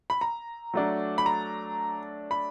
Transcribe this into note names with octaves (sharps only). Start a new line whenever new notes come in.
B5
A#5
F#3 A3 D4
B5
A#5
B5